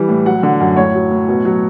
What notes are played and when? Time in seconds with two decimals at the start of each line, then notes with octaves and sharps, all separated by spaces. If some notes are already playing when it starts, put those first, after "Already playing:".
Already playing: E3 G3
0.09 A2
0.26 F#3 F#5
0.43 D3
0.60 F#2
0.77 A2 C#5
0.94 F#3
1.11 A2
1.28 B2
1.45 F#3